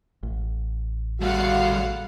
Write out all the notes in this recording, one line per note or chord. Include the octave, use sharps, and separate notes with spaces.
A1
G3 A3 F#4 F5 F#5